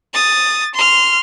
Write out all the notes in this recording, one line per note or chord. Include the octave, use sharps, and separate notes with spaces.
D#6 A6
C6 F6